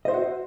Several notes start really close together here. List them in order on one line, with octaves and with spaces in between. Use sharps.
D#5 C5 E5 F#4